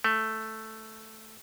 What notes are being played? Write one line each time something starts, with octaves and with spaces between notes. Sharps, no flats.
A3